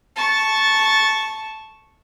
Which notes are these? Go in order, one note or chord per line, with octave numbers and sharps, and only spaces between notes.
A5 C#6